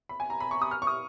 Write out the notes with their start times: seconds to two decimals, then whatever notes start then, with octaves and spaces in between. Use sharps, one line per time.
0.09 B5
0.20 G#5
0.30 A#5
0.40 B5
0.51 C#6
0.62 D#6
0.71 F6
0.82 C#6
0.87 D#6